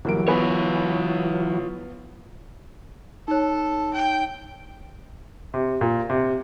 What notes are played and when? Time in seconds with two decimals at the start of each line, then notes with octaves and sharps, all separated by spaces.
0.05 G1 E3 F#3 A#3 D7
0.28 B3 F4 B4 C#5 G#5
3.28 D#4 A4 C#5
3.94 G5
5.54 C3
5.81 A#2
6.10 C3